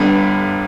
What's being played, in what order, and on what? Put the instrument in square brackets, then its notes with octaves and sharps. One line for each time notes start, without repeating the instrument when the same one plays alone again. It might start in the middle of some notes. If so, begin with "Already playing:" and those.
Already playing: [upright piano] G1 G2 D3 G3 B3